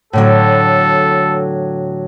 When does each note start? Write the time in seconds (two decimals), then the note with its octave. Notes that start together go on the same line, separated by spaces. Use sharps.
0.13 A2 D3 F#3 A4